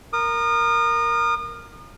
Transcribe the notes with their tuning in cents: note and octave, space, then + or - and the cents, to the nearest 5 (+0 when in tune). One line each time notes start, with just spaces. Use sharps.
A#4 +0 D#6 -35